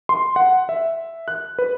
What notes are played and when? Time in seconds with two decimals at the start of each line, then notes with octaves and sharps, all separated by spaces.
0.09 C6
0.36 F#5
0.69 E5
1.28 F#6
1.59 B4